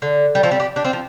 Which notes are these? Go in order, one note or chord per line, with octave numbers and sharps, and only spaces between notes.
D3
G3
F3 A3
G3 C4
D4 G4
D4 G4
C4 F4
F3